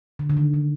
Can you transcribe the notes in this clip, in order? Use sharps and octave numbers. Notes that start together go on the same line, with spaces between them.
D3
D3
D#3
D#3